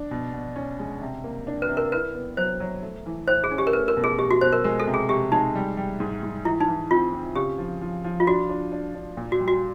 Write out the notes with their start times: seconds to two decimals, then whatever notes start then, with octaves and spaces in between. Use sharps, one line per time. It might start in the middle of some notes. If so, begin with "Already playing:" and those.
Already playing: D4
0.11 B2
0.34 B2
0.56 C#4
0.79 G#3
1.01 C3
1.24 A#3
1.47 D4
1.62 B4
1.69 C3
1.77 A#4
1.92 E4 B4
2.14 B3
2.37 F#3 C5
2.60 F#3
2.83 A3
3.06 E3
3.28 A2 C5
3.44 G#4
3.51 C#4
3.58 G4
3.67 A#4
3.73 A3 B4
3.88 A#4
3.97 B2
4.04 G#4
4.19 B2 G4
4.31 F#4
4.41 B2 C5
4.53 A#4
4.64 G#3 A#4
4.80 A4
4.87 C3
4.94 G#4
5.09 C3 G4
5.32 G#3 D#4
5.55 G3
5.77 G3
6.00 G#2
6.23 G#2
6.45 E3 E4
6.60 D#4
6.68 E3
6.91 C4 F4
7.14 C4
7.36 C#3 G4
7.58 F3
7.81 F3
8.04 F3
8.20 F4
8.27 D4 F#4
8.49 D4
8.72 D4
8.95 D4
9.17 A#2
9.32 F#4
9.40 G3
9.48 F#4